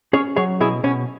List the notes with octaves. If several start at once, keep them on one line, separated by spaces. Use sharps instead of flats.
C#4 G#4 C#5
F#3 G#4 C#5
B2 E4 G#4
B2 C#4